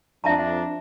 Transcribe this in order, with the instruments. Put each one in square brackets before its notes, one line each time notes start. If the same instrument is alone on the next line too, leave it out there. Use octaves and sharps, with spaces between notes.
[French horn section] F2 D4 [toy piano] E5 A5 A#5